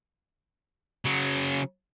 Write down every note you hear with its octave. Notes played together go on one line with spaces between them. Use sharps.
C#3 F#3